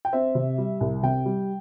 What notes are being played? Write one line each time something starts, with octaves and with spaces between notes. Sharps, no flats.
G5
C4 E5
C3
G3
C2
C3 G5
G3